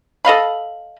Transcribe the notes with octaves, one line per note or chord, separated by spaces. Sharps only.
A4 D#5 F5 B5